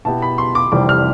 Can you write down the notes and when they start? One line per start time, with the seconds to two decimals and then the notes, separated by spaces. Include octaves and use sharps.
0.05 B2 B3 E4 G4 A5
0.22 B5
0.38 C6
0.55 D6
0.72 F1 F2 C3 E3 G3 D6
0.89 F6